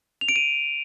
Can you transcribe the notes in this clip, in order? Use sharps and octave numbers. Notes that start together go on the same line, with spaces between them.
F7
D7
D#7